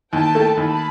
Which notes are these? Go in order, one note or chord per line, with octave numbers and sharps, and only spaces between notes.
D#2 G5 A5
A3
D#2 A5 B5